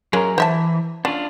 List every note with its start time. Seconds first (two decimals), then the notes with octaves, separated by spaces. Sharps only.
0.13 F#3 G#3 A#3 C#4 A#4
0.38 E3 C5 E5 A5
1.05 C#4 D4 F4